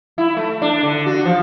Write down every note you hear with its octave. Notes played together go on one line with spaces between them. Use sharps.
E4
A3
D4
D3
F#4
F3